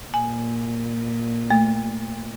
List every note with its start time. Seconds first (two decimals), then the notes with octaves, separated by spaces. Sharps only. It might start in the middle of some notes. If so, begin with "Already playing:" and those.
0.14 A#2 G#5
1.51 A3